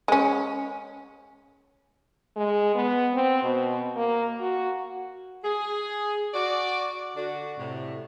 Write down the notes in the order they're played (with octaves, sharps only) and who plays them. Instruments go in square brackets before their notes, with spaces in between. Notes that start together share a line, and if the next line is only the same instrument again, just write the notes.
[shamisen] G#3 C#4
[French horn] G#3
B3
C4
B2
A#3
F#4
[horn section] G#4
F#4 D5
D3 D4 F#4
A2 C3